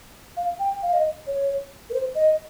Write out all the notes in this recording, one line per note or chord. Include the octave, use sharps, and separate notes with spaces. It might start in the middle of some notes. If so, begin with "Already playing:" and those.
F5
G5
F5
D#5
C#5
A#4
C5
D#5